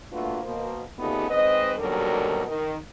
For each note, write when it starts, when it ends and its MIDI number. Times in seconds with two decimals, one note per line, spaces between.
0.12 0.38 57
0.12 0.38 58
0.12 0.38 62
0.12 0.38 65
0.12 0.38 66
0.12 0.38 71
0.43 0.80 47
0.43 0.80 58
0.43 0.80 72
0.98 1.27 46
0.98 1.27 49
0.98 1.27 57
0.98 1.27 59
0.98 1.27 63
0.98 1.27 67
1.29 1.73 44
1.29 1.73 60
1.29 1.73 71
1.29 1.73 75
1.78 2.41 39
1.78 2.41 47
1.78 2.41 50
1.78 2.41 54
1.78 2.41 55
1.78 2.41 70
2.46 2.75 51
2.46 2.75 70